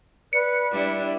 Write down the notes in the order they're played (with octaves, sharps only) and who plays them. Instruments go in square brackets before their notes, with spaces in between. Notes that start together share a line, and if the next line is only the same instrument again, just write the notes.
[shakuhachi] B4 [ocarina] D5 [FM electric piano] C#7
[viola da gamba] G3 D4 E4